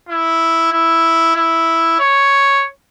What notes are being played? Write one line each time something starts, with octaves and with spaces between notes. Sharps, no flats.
E4
E4
E4
C#5